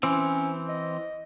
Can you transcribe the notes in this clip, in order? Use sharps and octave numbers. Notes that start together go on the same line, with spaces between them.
E3 C4 C#4
D#5